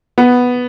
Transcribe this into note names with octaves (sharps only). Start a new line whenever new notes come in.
B3